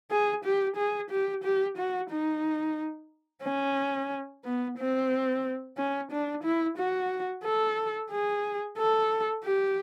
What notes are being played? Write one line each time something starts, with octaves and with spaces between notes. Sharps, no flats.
G#4
G4
G#4
G4
G4
F#4
D#4
C#4
B3
C4
C#4
D4
E4
F#4
A4
G#4
A4
G4